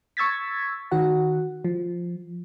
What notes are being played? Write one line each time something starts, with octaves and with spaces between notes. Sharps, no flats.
C#6 E6 G#6 A6 B6
D#3 F#4 F#5
F3